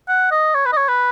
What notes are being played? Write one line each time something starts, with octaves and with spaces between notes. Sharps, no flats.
F#5
D#5
C#5
B4
D#5
C#5
B4